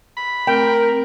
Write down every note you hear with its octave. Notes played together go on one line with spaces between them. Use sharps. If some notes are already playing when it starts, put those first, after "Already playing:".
B5
A3 C4 A#4 G5 A#5